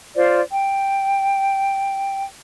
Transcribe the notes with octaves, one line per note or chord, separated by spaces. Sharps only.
F4 C5 D5
G5